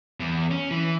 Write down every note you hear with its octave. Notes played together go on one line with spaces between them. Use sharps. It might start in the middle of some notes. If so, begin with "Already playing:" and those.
E2
C#4
E3